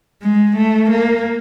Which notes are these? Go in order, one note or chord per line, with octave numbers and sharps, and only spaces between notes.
G#3
A3
A#3